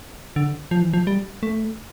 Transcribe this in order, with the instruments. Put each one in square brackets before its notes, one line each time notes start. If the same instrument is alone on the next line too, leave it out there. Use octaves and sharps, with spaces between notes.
[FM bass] D3
F3
E3
F3
G3
A3